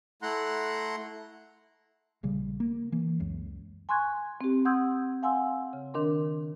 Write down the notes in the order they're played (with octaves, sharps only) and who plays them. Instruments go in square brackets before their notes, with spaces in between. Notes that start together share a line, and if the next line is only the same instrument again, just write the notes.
[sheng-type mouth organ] A3 E4 F#5 A#5 C6 F#6
[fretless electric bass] A#1 C#3 G3
A#3
E3 A#3
C#2 F#2
[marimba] G#5 C6 C#6 F#6 G#6
C4 G4
F#5 C6 D#6 E6 G6 G#6
F5 F#5 G#5 C6 E6
C#3
D#3 D4 A#4 C6